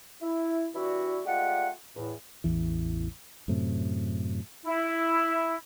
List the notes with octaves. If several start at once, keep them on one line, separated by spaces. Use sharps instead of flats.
E4
E3 G3 D4 E4 F#4
G#3 A3 F4 G4 D5 F#5
E2 A2
A1 E2 E3
F#2 A2 C3
E4